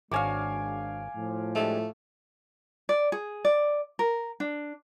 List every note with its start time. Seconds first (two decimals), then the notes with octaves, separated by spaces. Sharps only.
0.11 G#1 G#3 D4 F#4 C#5 F5 G#5 D6
1.15 A2 F3
1.56 G#3 A3 D4 G4
2.89 D5
3.12 G#4
3.45 D5
3.99 A#4
4.40 D4